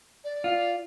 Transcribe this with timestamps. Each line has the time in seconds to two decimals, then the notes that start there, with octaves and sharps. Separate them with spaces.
0.24 D5
0.44 F4